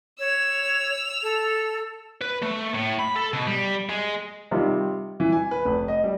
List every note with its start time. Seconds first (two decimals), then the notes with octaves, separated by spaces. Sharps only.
0.19 C#5 E6 F7
1.23 A4
2.21 B4
2.43 A3
2.75 A2
3.00 B5
3.16 A4
3.33 B2
3.47 G3
3.90 G#3
4.51 C3 D#3 G3 F4
5.20 E3
5.32 G#5
5.51 B4
5.66 F1
5.88 D#5
6.04 G3